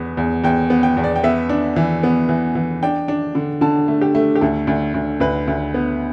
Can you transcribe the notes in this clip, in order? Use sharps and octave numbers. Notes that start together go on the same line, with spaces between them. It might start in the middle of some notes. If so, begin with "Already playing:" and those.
Already playing: E2 B3
E2
E2 G5
B3
G5
E2
D5
G5
B3 E5
D4
E3
B3
E3
E3
D4 G5
D4
D3
D3 A5
A3
G4
A3
G4
D2 A4
D2
D2
D2 B4
D2
B3